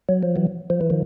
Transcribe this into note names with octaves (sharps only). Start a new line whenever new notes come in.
F#3
F3
E3 F#3
F3
E3
D#3 F3